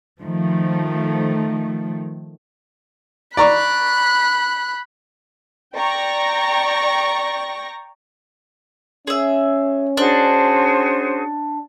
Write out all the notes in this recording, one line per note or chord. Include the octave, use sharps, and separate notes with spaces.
D#3 F3 A3
D5 A#5 B5 C#6 F#6
D5 G5 A#5 C#6 A#6
C#4 G#4 E5
D4 F#4 G#4 C5